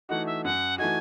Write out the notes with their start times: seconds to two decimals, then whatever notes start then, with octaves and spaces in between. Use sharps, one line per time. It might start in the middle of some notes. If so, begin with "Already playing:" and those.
0.09 E3 A3 D#4 F#4 F#5
0.26 E5
0.44 F#2 F#5
0.78 E3 A3 D#4 F#4 G#5